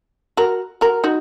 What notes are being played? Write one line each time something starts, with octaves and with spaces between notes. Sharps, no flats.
F#4 A#4
F#4 A#4
D#4 F#4